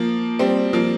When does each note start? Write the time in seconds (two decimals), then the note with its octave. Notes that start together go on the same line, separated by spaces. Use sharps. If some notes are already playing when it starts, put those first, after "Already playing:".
Already playing: F3 A#3
0.39 G3 C4
0.73 F3 A#3